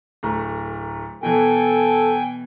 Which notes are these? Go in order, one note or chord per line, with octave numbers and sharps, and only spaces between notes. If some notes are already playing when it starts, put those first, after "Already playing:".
D1 A3 A#5
B2 E3 A4 G5 G#5